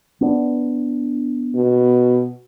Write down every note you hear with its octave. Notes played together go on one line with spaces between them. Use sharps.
B3 D4
B2